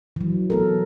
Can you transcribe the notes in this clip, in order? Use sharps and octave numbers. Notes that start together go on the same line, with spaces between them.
E3 F#3
B3 A4 A#4